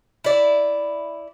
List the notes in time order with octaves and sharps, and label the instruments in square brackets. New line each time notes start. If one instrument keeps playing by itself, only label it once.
[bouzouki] E4 D5